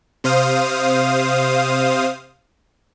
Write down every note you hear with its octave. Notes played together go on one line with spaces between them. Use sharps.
C3 C5 F5 D#6